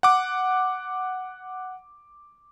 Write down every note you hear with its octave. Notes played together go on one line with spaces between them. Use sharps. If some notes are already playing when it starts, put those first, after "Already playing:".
F#5 D6